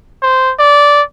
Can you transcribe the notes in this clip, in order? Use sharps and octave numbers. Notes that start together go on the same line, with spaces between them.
C5
D5